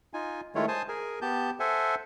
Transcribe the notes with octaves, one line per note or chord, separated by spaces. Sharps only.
D#4 F4 G#5
D#3 G#3 A3 E4 F4 C#5
C5 G#5 A5 D#6
G#4 A#4 G#5
B3 G4 A5 G6
A4 C5 E5 F#5 G#5